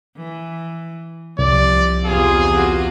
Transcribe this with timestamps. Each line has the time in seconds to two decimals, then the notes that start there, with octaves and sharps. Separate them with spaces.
0.17 E3
1.39 C2 C3 F3 D5
2.06 E2 C3 F4 G#4
2.53 F4 F#4